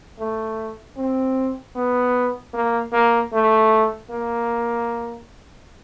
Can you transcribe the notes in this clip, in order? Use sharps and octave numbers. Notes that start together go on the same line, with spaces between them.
A3
C4
B3
A#3
A#3
A3
A#3